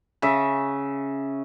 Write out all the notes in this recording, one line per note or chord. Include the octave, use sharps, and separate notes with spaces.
C#3 E5